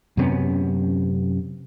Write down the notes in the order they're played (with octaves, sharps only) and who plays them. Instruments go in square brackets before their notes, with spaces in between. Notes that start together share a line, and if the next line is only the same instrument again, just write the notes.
[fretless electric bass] F#2 C3 B3 C#4